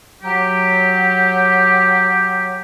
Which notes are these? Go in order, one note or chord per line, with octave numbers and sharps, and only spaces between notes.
F#3 G4